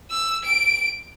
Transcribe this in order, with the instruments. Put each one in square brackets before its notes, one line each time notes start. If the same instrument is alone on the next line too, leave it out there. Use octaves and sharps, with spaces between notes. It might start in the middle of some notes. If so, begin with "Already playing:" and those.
[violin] E6
D7